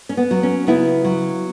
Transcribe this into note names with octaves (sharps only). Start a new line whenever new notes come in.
C#4
B3
F#3
C#4
C#3 B3 E4
F#3